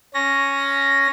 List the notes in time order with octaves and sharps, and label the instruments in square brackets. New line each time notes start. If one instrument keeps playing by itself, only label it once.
[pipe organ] C#4 A#6